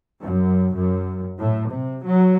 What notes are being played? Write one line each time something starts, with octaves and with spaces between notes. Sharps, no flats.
F#2
F#2
A2
C3
F#3